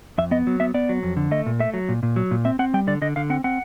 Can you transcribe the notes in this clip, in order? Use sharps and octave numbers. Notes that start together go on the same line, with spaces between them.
F2 E5
B3 D#5
F#3
B3 E5
B3 D5
F#3
F2
D3
A3 D#5
A#2
A3 E5
F#3
A#2
A#2
F#3
A#2
C4 E5
C4 F#5
G3 G5
D3 D5
D3 D#5
D3 F5
C4 F#5
C4 F#5